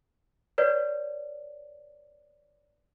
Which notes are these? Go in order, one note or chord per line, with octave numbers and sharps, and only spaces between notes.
B4 C#5 D5